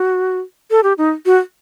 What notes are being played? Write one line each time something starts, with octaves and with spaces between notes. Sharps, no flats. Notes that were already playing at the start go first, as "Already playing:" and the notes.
Already playing: F#4
A4
G4
D#4
F#4